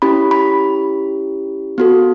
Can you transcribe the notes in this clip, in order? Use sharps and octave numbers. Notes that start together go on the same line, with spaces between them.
C#4 E4 G4 B5
B5
B3 F#4 A4